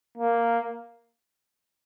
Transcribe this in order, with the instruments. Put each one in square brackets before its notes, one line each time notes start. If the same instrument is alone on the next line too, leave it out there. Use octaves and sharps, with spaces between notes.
[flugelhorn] A#3